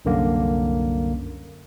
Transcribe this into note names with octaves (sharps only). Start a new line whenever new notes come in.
C2 F#2 D3 A#3